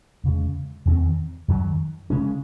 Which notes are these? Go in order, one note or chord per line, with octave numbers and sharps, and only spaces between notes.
E2 C#3 G#3
E2 D#3 A3 C4
F#2 D#3 F#3
C#3 G#3 C#4